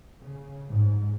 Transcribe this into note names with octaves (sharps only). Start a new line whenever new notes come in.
C#3
G#2